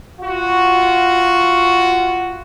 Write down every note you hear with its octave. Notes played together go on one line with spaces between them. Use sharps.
F4 F#4